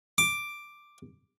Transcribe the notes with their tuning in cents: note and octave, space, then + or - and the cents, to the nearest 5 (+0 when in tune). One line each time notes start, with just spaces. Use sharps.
D6 +5